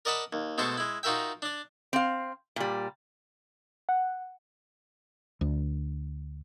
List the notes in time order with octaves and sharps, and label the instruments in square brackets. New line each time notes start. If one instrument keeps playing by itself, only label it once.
[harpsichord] A#4 D5 D#5 F#5 A5 B5
D#2
B2 G#3 A3 A4 C5 C#6
G#3 E4
D#4 F4 F#4 A#4 E5 G5
D4 D5
[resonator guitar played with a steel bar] C4 F5
A#2 G3
[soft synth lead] F#5
[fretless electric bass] D2